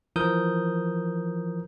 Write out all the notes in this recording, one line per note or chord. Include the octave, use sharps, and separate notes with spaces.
E3 F3 A#4 D#6 G6